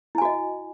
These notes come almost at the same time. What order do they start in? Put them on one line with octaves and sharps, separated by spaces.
E4 G#5 F#4 D#5